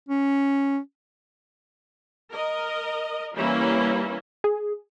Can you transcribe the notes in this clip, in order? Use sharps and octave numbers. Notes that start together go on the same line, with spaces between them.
C#4
A#4 D#5
E3 G3 A#3 C#4 E4
G#4